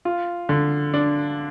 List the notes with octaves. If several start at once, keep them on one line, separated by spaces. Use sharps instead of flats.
F4
D3
D4